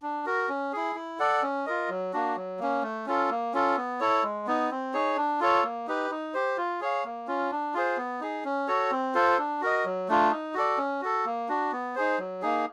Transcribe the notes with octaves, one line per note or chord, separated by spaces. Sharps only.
D4
F#4 A#4
C#4
E4 G#4
E4
A4 D5 F#5
C#4
F4 A#4 D#5
F#3
A#3 D4 F#4
F#3
A#3 C#4
A3
C#4 F4 A4
A#3
C#4 F4 A4
B3
E4 A4 C#5
G#3
B3 D#4
C4
D#4 G#4 C#5
D4
F4 A4 C#5
A#3
D#4 G4 B4
D#4
G4 C5
F4
G#4 C#5 F5
A#3
C#4 F4
D4
F4 G#4 C5
B3
D#4 G#4
C#4
F#4 A4 C#5
C4
F4 A4 C5
D4
F#4 A#4 D#5
F#3
A3 D4 F4
D#4
F#4 A4 D5
C#4
F#4 A4
A#3
D4 F#4
B3
D#4 G#4 C5
F#3
A#3 D#4 G#4